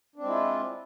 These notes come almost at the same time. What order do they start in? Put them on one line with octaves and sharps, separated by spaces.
D4 C4 G#3 E4 F4